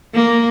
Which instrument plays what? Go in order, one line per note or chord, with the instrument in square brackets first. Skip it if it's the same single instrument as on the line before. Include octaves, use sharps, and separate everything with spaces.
[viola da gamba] A#3